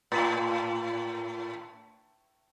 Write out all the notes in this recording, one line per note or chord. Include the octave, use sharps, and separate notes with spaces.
A2